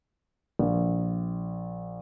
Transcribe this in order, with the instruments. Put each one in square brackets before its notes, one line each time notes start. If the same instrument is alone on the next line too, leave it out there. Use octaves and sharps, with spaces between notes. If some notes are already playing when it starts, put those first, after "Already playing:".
[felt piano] A#1